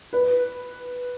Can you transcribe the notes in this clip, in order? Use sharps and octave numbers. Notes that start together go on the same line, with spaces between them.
B4